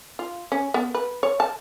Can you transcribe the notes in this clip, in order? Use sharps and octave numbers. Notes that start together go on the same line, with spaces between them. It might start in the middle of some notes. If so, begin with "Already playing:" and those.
F4
C#4
B3
B4
C#5
A5